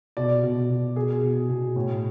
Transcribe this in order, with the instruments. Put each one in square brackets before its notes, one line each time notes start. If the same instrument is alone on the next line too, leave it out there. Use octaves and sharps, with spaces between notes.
[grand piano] B2 D5
B2
B2
B2 G#4
B2
B2
A2